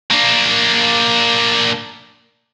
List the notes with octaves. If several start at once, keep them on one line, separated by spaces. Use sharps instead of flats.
A#3 D4